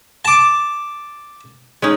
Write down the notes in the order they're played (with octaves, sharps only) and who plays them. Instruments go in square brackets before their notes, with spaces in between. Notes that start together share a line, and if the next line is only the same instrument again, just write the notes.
[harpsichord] A5 D6
[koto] G#3 C#4 D#4